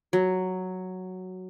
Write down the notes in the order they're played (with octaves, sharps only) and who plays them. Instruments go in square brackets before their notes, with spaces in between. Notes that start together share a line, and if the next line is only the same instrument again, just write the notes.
[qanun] F#3